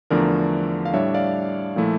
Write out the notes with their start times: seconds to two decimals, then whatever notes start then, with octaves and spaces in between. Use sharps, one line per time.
0.10 E2 D3 F3 A3 D4 A#4 D5
0.85 F5
0.93 A2 G3 D4 C#5 E5
1.14 D5 F5
1.76 A#2 F3 A3 E4